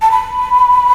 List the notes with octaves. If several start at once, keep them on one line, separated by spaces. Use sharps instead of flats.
A5
B5